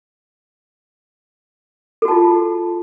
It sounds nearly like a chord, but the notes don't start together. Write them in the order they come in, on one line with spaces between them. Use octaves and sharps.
A4 F#4 A5 F4